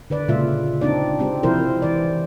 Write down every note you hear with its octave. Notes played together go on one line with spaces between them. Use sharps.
D3 B4 D5
A#2 C#3 G#3 F4 E5
C4 D4 D#4 D5
G#3 C4 G4
C3 F3 E4 A#4 C5
E3 D5